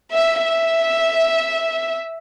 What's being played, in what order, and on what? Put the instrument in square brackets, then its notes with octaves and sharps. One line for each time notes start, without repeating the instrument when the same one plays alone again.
[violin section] E5
E5